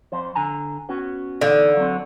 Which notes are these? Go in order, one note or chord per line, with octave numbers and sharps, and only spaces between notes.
F2 C5
D3 G#5 A#5
B3 C#4 F#4
E2 D3 D#4 F5
F#3 C4